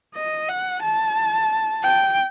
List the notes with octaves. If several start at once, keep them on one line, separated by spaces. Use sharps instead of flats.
D#5
F#5
A5
G5